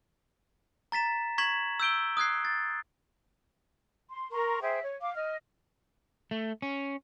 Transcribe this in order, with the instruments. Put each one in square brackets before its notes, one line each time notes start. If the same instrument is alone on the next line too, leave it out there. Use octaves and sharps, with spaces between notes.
[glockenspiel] A#5 A6 B6 E7
C#6 G#6 B6 E7 F#7
E6 G6 D7 G7
D#6 F#6 G#6 C7
A6
[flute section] C6
A#4 A#5 C6 C#6
G#4 C5 E5 G5
C#5
F5 D6
D#5 F6
[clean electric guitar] A3
C#4